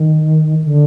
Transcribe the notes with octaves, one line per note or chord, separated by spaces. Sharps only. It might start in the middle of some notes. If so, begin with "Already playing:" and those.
Already playing: D#3
D3